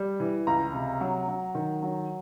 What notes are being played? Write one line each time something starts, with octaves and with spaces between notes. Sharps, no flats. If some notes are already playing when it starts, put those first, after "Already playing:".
Already playing: G3
E3
C#2 A#5
C3
F#3
F#3
D#3
F#3